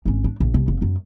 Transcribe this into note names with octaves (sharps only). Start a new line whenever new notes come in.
G#1 C#4
D4
A#1
C2
F1
F#2 F#3